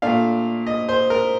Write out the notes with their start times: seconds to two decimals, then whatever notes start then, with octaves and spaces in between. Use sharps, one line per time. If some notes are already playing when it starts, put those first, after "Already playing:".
0.02 A#2 A3 D4 F5
0.67 D#5
0.89 C5
1.10 A#4